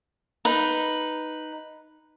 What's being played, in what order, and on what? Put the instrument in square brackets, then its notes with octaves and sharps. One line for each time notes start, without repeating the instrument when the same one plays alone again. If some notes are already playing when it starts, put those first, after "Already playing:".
[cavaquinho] D#4 B4